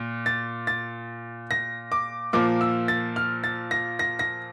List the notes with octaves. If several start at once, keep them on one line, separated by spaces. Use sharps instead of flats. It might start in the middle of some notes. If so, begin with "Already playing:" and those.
Already playing: A#2
A6
A6
A#6
D6
A#2 F3 A#3 D6
E6
A6
F6
A6
A#6
A#6
A#6